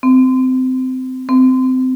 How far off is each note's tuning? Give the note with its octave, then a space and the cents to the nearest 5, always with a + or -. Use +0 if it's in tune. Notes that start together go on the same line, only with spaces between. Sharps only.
C4 -25
C4 -25